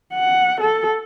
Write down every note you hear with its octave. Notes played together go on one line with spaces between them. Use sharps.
F#5
A4